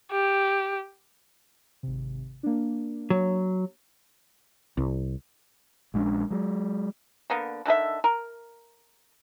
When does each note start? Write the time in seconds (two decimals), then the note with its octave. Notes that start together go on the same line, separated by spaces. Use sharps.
0.12 G4
1.83 G#1 C3
2.43 A#3 D4
3.10 F#3
4.77 C2
5.94 A#1 G#3 C#4 D4
6.30 F#3 G#3
7.30 D3 A#3 B3
7.65 D3 D#3 A4 E5
8.04 A#4